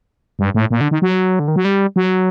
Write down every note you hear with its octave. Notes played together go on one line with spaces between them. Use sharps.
G2
A2
A#2
D3
D#3
F#3
D3
D#3
F#3
G3
F#3